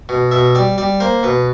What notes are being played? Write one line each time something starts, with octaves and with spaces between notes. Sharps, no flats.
B2
B2 E5
G3 D5
G3 D5
A#3 C5
B2 B4